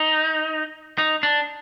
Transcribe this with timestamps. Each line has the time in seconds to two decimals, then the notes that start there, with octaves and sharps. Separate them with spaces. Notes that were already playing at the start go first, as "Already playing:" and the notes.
Already playing: D#4
0.98 D#4
1.23 D4